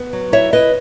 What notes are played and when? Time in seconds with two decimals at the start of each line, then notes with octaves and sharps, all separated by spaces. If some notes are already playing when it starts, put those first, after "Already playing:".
Already playing: B3
0.13 F#3
0.32 E4 C#5 E5
0.52 E4 B4 D#5